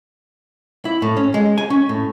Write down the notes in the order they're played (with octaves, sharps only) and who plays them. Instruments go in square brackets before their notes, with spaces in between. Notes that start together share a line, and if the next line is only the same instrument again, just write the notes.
[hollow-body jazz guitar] E4
A2
C#4
G#3
G#5
C#4
A2